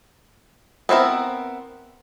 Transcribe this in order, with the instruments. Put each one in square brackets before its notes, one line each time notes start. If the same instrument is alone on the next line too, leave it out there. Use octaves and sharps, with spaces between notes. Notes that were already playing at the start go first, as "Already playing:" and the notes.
[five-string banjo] B3 C4 E4 A#4